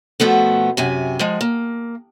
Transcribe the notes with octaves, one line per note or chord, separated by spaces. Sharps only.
B2 F3 A3 B3
F#2 C3 G#5
F3 G#3
A#3